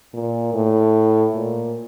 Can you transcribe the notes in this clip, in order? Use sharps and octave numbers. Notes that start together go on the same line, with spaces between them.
A#2
A2
A#2